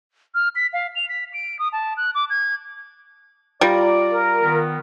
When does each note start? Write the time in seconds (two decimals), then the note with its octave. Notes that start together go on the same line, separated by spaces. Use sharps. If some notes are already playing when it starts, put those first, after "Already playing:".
0.35 F6
0.55 B6
0.73 F5
0.95 F7
1.09 B6
1.33 D7
1.59 D#6
1.72 A5
1.97 F#6
2.15 D6
2.30 G#6
3.61 G3 F4 D5 A#5
4.11 A#4
4.42 D#3 B3